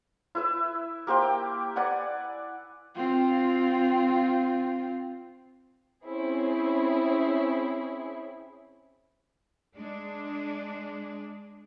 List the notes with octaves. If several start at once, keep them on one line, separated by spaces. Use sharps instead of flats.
E4 B4 E5
A#3 G4 C5 G5
B4 D5 F#5 G#5
C4 F4
C4 C#4 E4 G#4
G#3 D4